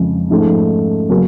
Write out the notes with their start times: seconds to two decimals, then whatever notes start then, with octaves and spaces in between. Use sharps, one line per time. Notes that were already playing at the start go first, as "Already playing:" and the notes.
Already playing: F2 C#3 F3 G#3
0.30 G#2 F3 A3 C#4
1.10 C#3 F#3 A#3 C#4